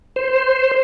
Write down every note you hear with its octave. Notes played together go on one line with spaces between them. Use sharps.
C5